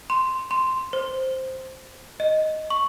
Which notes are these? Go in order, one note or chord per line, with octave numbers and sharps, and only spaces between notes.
C6
C6
C5
D#5
C#6